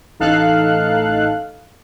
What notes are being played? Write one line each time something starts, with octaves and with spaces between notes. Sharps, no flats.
A1 D#4 A4 F5 F#6